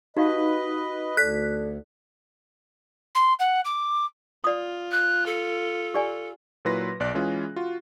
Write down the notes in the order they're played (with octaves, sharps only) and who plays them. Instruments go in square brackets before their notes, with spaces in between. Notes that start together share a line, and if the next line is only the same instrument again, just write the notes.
[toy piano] D#4 G4 F5 [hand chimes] F#4 [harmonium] B4 D#5
[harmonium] D2 [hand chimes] A4 D5 [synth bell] F#6 B6
[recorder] C6
F#5
D6
[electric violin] F4 [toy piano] D5 D#6
[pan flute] F#6
A4
[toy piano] G4 D5 G#5
[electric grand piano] A#2 F#3 E4 B4 C6 A#6
B1 D5 F#6
E3 G#3 C#4 F4 G#4
F4 F#4